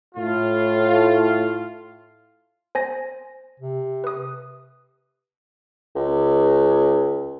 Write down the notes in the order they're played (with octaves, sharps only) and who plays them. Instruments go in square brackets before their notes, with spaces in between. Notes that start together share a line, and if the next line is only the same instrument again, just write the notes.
[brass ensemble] A2 F4
[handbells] C5 G#5 A#6
[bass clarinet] C3
[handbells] B4 D#6
[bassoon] C#2